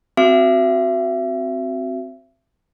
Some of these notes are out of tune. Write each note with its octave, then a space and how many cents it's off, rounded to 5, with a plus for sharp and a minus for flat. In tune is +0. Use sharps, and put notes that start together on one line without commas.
C4 +0 F#4 +0 E5 +30